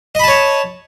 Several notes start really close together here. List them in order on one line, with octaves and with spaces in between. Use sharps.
D#5 B5 A5 C#5